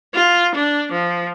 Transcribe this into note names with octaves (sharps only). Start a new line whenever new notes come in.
F4
D4
F3